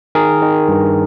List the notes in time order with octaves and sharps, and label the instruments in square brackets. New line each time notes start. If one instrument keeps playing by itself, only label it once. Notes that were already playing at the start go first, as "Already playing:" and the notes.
[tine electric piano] D#3 G#4 A#4
D#3
G2